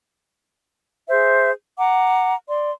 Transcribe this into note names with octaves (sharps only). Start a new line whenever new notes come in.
G#4 C5 E5
F#5 A#5 D6
D5 C6